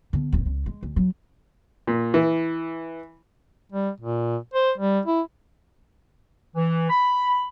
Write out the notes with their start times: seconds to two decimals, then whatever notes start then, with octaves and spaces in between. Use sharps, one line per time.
0.13 D3 B3
0.32 D1 C4
0.45 C#2
0.66 G#3
0.83 D2
0.96 F#3
1.87 A#2
2.14 E3
3.72 G3
4.00 A#2
4.54 C5
4.78 G3
5.06 E4
6.55 E3
6.90 B5